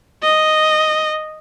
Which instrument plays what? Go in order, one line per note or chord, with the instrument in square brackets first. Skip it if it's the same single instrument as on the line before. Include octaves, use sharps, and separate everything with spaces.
[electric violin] D#5